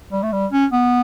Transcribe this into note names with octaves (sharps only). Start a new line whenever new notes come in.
G3
A3
G3
C#4
B3